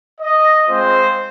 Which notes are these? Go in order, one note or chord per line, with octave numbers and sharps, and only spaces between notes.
D#5
G#3 C4 F4 C5